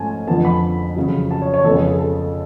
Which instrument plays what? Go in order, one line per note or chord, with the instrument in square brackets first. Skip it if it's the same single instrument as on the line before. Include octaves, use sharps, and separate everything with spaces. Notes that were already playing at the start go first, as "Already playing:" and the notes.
Already playing: [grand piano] G#2 F3 A3 C#4 G#5 A5
F2 D3 F3 B3 A5
B5
F2 C#3 F#3
A5
C#5
C#5
F2 C#3 G#3 B3 A4
G#4
G#4
A4